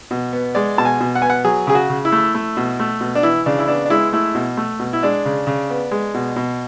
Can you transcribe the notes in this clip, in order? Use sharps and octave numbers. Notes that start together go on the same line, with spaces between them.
B2
B3
G#3 D5
B2 A5
G#5
B2
F#5
B3 G#5
F#5
F#3 G#4
C#3 G#4
F#4
C#3
E4
A3
A3
B2
A3
B2
D4
E3 E4
C#3 D4
E4
B3 D4
D4
G#3 E4
A3 E4
B2
A3
B2
E4
G#3 D4
C#3
C#3
B3
G#3
B2
B2